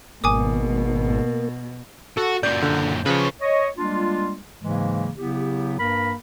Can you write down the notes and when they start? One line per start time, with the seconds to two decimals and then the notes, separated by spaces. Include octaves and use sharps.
0.24 G#1 B2 A#3 G#5 D6 D#6
2.17 F#4 A4
2.43 F#2 A#2 D5 G6
2.62 D3
3.06 C#3 F3 B4 C#5
3.41 C#5 D#5
3.77 G3 G#3 A#3 D4 F4
4.62 G#2 C#3 E3 F#3 G#3 A#3
5.16 C#3 F#3 B3 E4 G4
5.79 G2 A#3 A#4 B5